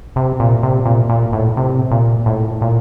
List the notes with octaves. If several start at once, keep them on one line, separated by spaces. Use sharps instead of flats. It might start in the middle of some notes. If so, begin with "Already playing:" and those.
C3
A#2
C3
A#2
A#2
A2
C3
A#2
A2
A#2